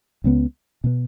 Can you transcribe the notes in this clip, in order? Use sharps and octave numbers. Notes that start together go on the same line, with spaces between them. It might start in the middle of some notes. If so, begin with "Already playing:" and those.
C#2 C#3 B3
B2 B3